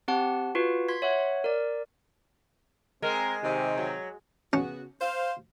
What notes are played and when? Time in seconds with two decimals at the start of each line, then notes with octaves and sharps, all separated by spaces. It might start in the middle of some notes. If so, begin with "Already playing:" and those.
0.08 C4 G4 F#5 A5
0.55 F4 F#4 B4
0.88 C6 G#6 B6
1.02 C#5 E5 F#5
1.44 A#4 D5
3.02 G#3 C4 A#4
3.43 C3 D#3
3.77 F#3
4.53 C#3 B3 C#4 F#4
5.01 C5 F5